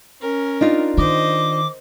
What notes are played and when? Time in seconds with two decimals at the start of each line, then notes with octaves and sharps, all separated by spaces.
0.21 C#4 A#4
0.61 D4 D#4 F4
0.97 D#3 C5 D#5 D6